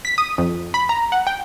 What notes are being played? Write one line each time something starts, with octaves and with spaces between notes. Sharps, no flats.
B6
D#6
F2
B5
A#5
F#5
G5